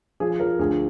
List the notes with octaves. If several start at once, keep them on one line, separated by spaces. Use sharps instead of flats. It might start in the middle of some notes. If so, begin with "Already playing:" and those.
F3 G#4
F3 A#4
D2 G#4